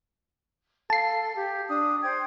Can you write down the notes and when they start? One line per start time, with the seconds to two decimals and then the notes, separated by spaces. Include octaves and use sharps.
0.90 A4 F5 A5 C7
1.35 G4
1.68 D4 D#6
2.03 C5 G5 G#6